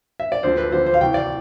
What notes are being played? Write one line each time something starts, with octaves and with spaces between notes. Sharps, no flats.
E5
D5
D2 D3 F3 C5
B4
D2 D3 F3 C5
C5
F5
C2 C3 E3 G5
D5